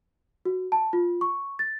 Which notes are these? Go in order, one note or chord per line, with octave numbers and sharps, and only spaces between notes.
F#4
A5
F4
C#6
A6